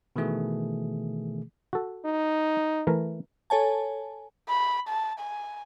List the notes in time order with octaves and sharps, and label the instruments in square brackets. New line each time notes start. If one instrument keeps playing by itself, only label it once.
[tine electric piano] B2 D#3 E3 A3 G#4
[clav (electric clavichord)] F#4 A4
[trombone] D#4
[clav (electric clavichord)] E3 A3 A#4
[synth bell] A4 C#5 G#5 A5
[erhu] B5
A5
G#5